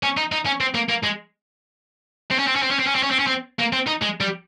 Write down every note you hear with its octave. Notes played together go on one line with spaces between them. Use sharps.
C#4
D#4
D#4
C#4
C4
A#3
A#3
G#3
C4
C#4
C4
C#4
C4
C#4
C4
C#4
C4
C#4
C4
C#4
C4
A#3
C4
D#4
G#3
G3